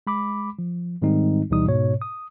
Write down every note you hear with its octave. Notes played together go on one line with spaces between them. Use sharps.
G#3 B5 D6
F3
G#2 D#3 G3 G#3 C4 D#4
D2 B2 E3 G3 D#4 D#6
G#2 B2 C#5
D#6